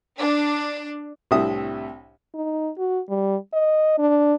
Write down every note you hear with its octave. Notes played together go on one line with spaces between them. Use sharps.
D4
C2 A2 C3 D4 E5 D#6
D#4
F#4
G3
D#5
D4